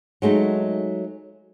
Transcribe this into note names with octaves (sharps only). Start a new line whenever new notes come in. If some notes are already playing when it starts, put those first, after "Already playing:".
F#3 G#3 A3 D#4